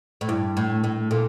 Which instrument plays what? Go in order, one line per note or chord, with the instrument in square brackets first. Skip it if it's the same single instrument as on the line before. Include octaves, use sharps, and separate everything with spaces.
[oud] A2
[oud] G2 [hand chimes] E4
[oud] A2
[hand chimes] G5
[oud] A2
[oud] A#2 [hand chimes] A4